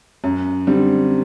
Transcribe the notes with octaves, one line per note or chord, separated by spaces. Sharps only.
F#2
D3 G3 C4